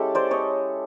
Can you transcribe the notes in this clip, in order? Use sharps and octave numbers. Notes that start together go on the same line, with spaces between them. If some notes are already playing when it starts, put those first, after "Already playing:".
Already playing: G#3 C#4 E4 G4 A4
C5 D5
C#5 D#5